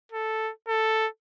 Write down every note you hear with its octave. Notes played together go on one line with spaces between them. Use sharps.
A4
A4